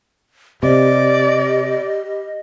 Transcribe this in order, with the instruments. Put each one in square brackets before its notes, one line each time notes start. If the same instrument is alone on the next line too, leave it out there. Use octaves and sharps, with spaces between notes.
[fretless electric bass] C3 [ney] G4 [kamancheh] D5 [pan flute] D#5